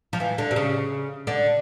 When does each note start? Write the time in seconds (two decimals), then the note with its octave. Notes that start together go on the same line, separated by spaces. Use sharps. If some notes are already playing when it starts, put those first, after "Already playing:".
0.13 F3
0.20 E3
0.38 D3
0.51 C3
0.56 C#3
1.27 D3